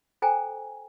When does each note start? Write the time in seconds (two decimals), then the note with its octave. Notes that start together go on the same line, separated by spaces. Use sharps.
0.22 A4 C5 G5 G#5 A#5